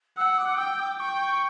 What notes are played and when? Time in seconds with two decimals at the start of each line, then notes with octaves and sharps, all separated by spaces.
0.17 F#5 E6
0.38 D6
0.58 G5 E6
0.79 D6
0.99 G5 C#6
1.21 C#6